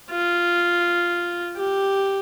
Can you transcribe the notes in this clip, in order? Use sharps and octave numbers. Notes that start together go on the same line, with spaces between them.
F4
G4